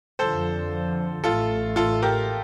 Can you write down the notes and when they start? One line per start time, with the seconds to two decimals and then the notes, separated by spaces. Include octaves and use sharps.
0.19 F2 D3 F3 A4 C5
1.24 A1 A2 A3 F4 A4
1.76 F4 A4
2.02 G4 A#4